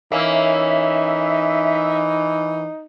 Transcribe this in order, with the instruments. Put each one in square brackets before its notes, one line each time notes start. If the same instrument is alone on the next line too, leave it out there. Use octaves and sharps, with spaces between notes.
[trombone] E3 [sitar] A#3 C#4 [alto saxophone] D#4 [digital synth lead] E5